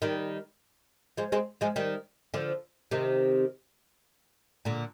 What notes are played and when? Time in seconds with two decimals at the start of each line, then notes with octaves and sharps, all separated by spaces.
0.02 D#3 G3
1.17 F3 G#3
1.32 G#3 C4
1.61 F3 G#3
1.76 D#3 G3
2.34 D3 F3
2.91 C3 D#3
4.65 A#2 D3